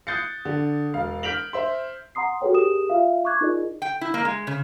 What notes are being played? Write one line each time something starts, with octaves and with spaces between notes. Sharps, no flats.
D#6 F#6 G6 A6 C7 C#7
D3
E1 F5
F6 G6 B6 D7 F7 F#7
C5 E5 C6
F#5 A#5 C6 D#6 C7
F#4 G#4 A4 B4 C#5 G5
G4 G#4 A#4 D#6 E7
F4 E5 F5
C#6 D6 F#6 G#6
D#4 F4 G#4 A#4 D5 D#5
G5
E4
A#3
G#3
C#3